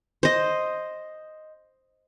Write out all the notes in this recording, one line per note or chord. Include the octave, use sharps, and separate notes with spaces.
C5 D#5